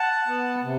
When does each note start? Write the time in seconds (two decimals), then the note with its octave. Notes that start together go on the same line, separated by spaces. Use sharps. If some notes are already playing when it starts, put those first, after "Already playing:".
Already playing: F#5 A5
0.27 B3
0.63 C3